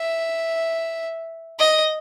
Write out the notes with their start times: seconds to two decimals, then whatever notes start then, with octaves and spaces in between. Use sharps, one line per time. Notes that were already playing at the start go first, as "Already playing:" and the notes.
Already playing: E5
1.59 D#5